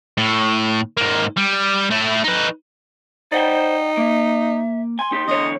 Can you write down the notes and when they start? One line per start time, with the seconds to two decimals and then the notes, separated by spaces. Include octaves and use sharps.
0.18 A2
0.97 G#2 A#3
1.37 G3
1.91 A3 E4
2.24 D#4 B4
3.32 D#4 C5 D5 F#5 G5
3.97 A#3 E5
4.99 G#5 C6
5.12 D#4 G4
5.28 E2 D3 C#5 D#5